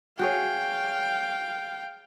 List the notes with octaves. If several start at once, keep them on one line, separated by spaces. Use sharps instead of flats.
F#4 G#4 C#5 F5 G5